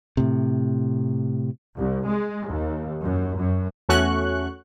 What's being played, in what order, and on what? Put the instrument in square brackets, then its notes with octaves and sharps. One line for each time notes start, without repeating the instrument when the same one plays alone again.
[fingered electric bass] A2 C3
[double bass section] C2
G#3
D#2
F#2
F#2
[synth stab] E2 A3 C#4 F#4 C#6 F#6